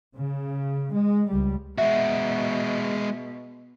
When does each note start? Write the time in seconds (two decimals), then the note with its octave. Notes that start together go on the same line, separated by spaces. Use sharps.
0.16 C#3
0.93 G#3
1.27 C#2 G3
1.78 B2 G#3 F#4 E5